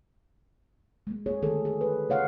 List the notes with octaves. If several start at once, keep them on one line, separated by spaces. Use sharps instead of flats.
G#3 A#3
A#3 G#4 C#5
D3 D#3 G#4 A4
G#4
B4
C#3 C#5 F5 F#5